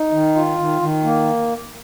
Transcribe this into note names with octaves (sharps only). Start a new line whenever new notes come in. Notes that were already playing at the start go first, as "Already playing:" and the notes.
Already playing: D#4
D#3
F4
D#3
D#3
A#3